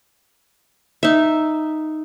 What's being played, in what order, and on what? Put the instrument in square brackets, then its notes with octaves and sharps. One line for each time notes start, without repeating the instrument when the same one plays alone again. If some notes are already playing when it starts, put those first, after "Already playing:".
[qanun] D#4 E5